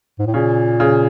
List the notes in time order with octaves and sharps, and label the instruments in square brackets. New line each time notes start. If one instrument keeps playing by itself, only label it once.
[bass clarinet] G#2
A2
[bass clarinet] A#2 [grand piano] C#3
[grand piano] C#3